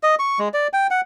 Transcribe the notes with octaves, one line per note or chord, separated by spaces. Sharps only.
D#5
C#6
G#3
D5
G5
F#5